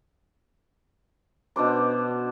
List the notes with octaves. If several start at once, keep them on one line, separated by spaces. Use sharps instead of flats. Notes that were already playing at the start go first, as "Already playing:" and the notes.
B2 D4 C5 D6